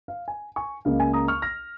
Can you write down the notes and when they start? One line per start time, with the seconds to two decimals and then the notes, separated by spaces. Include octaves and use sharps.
0.08 F5
0.28 G#5
0.56 G#5 C#6
0.85 C#2 C#3 A#3 F5
1.00 G#5
1.13 A#5 D#6
1.28 C#6 F6
1.42 F6 A#6